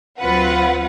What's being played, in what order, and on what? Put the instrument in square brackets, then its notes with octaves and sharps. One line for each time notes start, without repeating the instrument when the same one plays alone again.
[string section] D2 F#3 C4 F4 B4 F#5